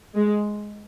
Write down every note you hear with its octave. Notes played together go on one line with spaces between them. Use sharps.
G#3